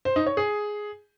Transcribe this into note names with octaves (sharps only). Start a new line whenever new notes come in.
C5
D#4
C#5
G#4